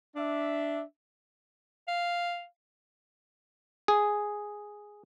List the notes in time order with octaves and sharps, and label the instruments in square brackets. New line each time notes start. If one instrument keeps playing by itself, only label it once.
[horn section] D4 E5
[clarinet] F5
[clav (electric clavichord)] G#4